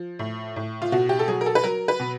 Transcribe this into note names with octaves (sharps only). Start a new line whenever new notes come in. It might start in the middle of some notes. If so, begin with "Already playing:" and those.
Already playing: F3
A2
A2
F4
B2 F#4
G4
A4
F#3 G#4
A#4
A4
B4
F#3 A#4
B4
B2